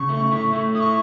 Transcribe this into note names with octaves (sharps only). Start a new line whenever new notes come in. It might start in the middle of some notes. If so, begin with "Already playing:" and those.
Already playing: C#3 C#6
A3
E4
A3
E4 D#6
C#6